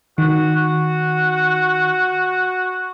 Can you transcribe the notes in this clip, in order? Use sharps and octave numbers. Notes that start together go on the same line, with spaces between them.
D#3 F#4
F#4